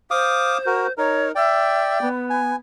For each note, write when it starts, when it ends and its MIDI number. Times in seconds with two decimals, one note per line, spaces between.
0.11 0.92 72
0.11 0.58 77
0.11 0.58 86
0.11 0.58 87
0.66 0.87 66
0.66 0.87 70
0.98 1.32 63
0.98 1.32 70
0.98 1.28 73
1.35 2.09 74
1.35 1.98 76
1.35 2.09 79
2.01 2.52 59
2.30 2.56 80